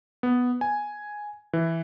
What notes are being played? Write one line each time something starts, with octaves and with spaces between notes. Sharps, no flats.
B3
G#5
E3